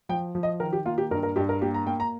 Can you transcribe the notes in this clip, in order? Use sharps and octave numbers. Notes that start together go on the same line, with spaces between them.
F3 G5
F3
D#5
D#3 A#4
G4
A#3 F4
G4
G2 A#4
A#4
G2 G4
A#4
A#3 G4
A#5
A#3 G5
A#5